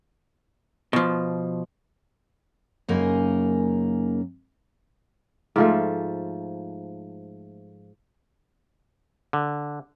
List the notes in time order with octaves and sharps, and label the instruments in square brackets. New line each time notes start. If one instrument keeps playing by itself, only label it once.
[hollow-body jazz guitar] B2 F3
[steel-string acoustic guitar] F#2 C#3 A#3 D#4 G#5
[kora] G#2 F3 A3
[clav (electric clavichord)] D3